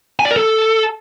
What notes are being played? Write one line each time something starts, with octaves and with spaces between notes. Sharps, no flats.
G#5
D5
A#4
A4